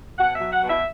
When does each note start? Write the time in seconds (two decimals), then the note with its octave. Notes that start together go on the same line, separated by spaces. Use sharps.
0.18 B2 F#5
0.35 E5
0.41 F#3
0.52 F#5
0.63 B2
0.69 E5